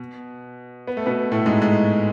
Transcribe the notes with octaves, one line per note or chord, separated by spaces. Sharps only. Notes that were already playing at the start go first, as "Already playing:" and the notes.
Already playing: B2
B3
A3
B2 B3
A2 A3
G#2 G#3
G#3